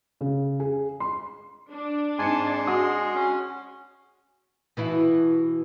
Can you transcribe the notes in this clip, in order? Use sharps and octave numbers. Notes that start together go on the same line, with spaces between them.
C#3
G#4
C6
D4
G#2 C4 G#4 G#5 A5 C6 C#7
G#3 F#4 D#6
C#4
B2 E3 E4